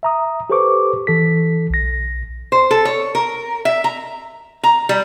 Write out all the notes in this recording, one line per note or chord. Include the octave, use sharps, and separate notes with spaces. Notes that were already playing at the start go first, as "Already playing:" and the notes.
E5 A#5 D#6
G4 A4 B4 C5 C#6 D6
E3 A4 B6
B1 A#6
C5
A4
C#5
A#4
E5
A#5
A#5
G3